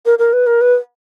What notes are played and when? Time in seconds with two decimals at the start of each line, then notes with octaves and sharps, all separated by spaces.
0.06 A#4
0.19 A#4
0.33 B4
0.47 A#4
0.61 B4